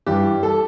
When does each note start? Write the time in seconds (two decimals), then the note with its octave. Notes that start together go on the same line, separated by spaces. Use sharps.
0.06 G2 E3 G3 G4
0.43 A4